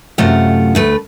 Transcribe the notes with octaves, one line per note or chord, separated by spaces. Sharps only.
F#2 C3 A3 F4 F#5
D2 A3 B4